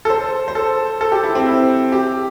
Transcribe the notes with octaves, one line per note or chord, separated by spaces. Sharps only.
A4
C5
C5
A4
A4
G4
E4
C4
E4
G4